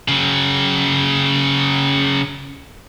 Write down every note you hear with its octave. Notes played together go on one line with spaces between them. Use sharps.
C#3 F#3